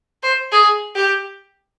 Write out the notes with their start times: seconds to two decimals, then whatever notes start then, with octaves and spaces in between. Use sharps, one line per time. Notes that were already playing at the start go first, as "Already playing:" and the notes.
0.23 C5
0.52 G#4
0.96 G4